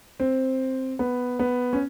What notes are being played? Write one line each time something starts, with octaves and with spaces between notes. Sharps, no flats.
C4
B3
B3
C#4